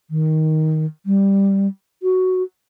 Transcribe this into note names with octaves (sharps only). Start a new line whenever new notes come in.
D#3
G3
F#4